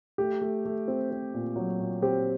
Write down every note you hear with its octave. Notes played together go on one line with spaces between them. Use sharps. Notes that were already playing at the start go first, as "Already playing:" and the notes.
A3 G4
A3
A3
C4
C4
A#2
F#3
A#2
C4 G4